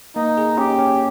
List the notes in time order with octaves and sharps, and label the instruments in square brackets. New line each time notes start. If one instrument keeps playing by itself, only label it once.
[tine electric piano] A#3 [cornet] D#4
[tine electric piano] G#4
[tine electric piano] C#4 [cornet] G4
[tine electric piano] C#4